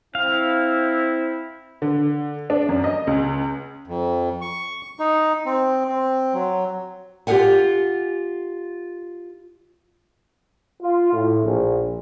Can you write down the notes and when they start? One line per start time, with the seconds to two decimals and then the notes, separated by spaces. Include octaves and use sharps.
0.15 C4 E4 F5
1.82 D3
2.50 D4
2.69 F#2
2.84 D#5
3.07 C#2
3.87 F2
4.41 C#6
5.00 D#4
5.46 C4
5.89 C4
6.34 F#3
7.27 F4 G4 G#4 A#4 F#5 G#5
10.82 F4
11.13 A2
11.44 A#1